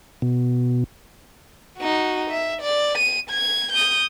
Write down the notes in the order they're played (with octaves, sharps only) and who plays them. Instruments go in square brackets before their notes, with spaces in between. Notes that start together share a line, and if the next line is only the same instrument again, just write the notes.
[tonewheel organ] B2
[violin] D#4 F#4
E5
D5
D#7
G#6
D#6 G6